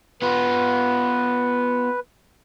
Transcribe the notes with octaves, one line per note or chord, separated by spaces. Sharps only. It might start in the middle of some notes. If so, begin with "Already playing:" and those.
B3 F4 B4